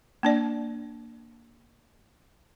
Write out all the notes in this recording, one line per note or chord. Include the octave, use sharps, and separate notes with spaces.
A#3 D4 D5